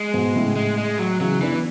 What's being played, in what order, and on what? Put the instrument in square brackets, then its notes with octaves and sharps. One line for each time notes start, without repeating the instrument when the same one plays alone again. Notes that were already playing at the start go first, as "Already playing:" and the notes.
Already playing: [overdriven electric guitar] G#3
[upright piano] G#2 B2
A2 C#3
[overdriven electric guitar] G#3
G#3
F#3
[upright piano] C#3 E3 [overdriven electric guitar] F#3
[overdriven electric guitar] E3 [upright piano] B3 D4